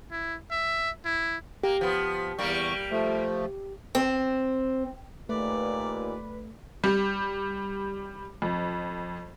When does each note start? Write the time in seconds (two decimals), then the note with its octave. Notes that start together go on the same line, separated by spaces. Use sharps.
0.11 E4
0.51 E5
1.05 E4
1.63 A#3 G4
1.81 F3 B3
2.38 E2 G3 A#3 C#6
2.91 F3 A3
3.95 C4
5.29 D#2 A#2 A3 B4 D5
6.84 G3
8.42 F2